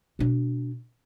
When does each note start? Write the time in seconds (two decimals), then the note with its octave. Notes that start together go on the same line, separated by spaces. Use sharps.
0.19 B2 D4